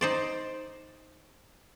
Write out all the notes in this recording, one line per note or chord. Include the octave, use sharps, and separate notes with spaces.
D#4 C5 D5